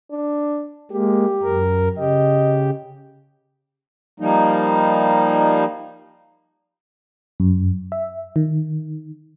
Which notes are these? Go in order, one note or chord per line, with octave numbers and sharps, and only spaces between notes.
D4
G#3 A#3 G4
F#2 A#4
C#3 G4 D#5
F3 G3 A#3 D#4
F#2
E5
D#3